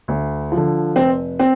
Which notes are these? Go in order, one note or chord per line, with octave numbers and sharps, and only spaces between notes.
D2
F3
D3
F1 C4
C4